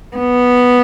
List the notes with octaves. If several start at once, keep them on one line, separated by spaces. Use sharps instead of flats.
B3